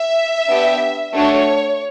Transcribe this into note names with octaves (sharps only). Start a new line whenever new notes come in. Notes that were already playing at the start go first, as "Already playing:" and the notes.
Already playing: E5
B3 D4 G4
A3 D4 F#4 A4 C#5